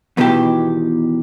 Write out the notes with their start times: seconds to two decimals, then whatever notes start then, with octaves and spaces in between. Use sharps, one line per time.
0.17 E2 B2 D#3 E3 G4